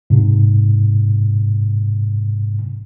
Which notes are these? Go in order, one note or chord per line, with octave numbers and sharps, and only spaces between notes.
G#2 C3